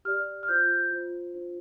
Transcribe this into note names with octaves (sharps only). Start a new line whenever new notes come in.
G4 D5 F6
F6
F4 C5 G6
F4 C5
D4 F4 C5